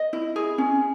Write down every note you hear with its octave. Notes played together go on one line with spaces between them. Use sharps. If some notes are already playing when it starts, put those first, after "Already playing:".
Already playing: D#5
E4
G#4
C#4